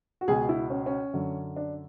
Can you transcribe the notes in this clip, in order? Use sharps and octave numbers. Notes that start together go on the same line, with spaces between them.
F#4
C#2 B2 G#4
E4
C#4
C#4
F#2 D3
D4